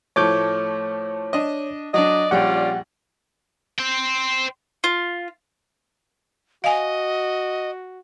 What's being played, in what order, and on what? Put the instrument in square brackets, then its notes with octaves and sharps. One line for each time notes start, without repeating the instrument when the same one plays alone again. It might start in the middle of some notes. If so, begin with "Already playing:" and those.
[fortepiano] A2 F3 A3 [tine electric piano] C#5 D6 G6
[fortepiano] D4 D#5
[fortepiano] F#3 D4 [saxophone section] D5 D#5
[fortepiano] A#1 G3 G5 [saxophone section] C#4 F4 D5 [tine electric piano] F#5
[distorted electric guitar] C5 G5
[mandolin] F4
[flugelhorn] F#4 [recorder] D#5 [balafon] F5 G#5